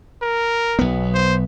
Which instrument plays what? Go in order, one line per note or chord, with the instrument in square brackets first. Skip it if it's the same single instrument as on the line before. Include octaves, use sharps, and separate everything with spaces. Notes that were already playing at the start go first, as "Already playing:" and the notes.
[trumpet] A#4
[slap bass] B1 B3
[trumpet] C5